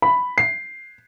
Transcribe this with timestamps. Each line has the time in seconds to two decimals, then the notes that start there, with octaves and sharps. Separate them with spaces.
0.02 B5
0.38 C7